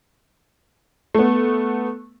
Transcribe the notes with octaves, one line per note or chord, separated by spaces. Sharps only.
A3 B3